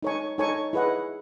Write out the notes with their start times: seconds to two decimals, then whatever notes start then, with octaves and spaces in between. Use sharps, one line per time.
0.03 D#4 A4 C#5 G#5 C#6
0.38 D#4 A4 C#5 G#5 C#6
0.73 E4 G#4 B4 D#5 F#5